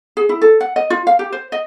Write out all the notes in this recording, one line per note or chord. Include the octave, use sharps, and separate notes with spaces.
G#4
E4
A4
F#5
D#5
F4
F5
G4
C5
D#5